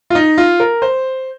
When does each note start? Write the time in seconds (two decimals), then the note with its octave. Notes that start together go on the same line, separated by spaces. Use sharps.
0.10 F4
0.15 D#4
0.38 F4
0.60 A#4
0.82 C5